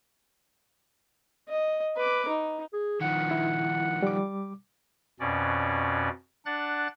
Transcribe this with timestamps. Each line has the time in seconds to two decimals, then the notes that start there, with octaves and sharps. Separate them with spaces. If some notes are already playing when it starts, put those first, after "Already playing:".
1.48 D#5
1.96 B4 D6
2.28 D#4
2.73 G#4
3.01 D#3 F3 F#5
3.31 E4
4.03 G3 D6
5.20 F2 B2 C#4 D5
6.45 D4 F#5 F#6 A6